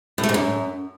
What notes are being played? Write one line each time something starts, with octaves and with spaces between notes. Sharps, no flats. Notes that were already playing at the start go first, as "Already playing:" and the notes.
A2
A3
G#2
F#2